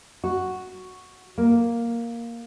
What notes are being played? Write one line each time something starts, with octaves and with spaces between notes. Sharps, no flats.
F#4
A#3